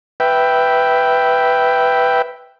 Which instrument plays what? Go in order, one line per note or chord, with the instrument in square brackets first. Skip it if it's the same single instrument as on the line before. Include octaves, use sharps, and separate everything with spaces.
[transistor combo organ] B4 E5 G5